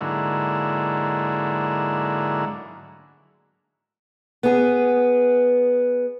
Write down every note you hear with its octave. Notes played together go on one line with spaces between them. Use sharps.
G#2 D3 F#3 A#3 E4
B3 G#4